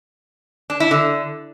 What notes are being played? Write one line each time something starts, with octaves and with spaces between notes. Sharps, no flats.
D4
E4
D3